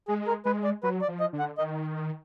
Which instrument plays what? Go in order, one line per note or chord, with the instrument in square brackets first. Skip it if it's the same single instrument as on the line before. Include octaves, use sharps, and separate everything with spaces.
[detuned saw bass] G#3 [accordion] G#4
[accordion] A#4
[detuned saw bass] G#3 [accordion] B4
[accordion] D5
[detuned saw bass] F#3 [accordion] B4
[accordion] D5
[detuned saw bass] F3
[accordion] D#5
[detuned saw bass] D3
[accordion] F#5
[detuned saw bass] D#3 [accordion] D#5